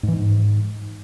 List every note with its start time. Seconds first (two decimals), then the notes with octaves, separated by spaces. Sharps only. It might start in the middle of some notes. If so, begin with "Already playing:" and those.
0.03 G#2
0.08 E3
0.13 G#2